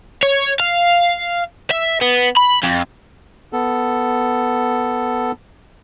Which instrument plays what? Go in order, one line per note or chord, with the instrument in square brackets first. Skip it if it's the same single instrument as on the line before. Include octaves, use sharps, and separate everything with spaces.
[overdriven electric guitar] C#5
F5
E5
B3
B5
F2
[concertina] B3 A4